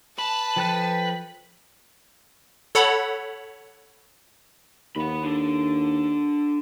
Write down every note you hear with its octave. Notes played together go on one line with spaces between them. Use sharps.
B4 A5
F3 A4 G5 F#6
A4 C#5 F#5 B5
D#2 F#5 B5
D4 A4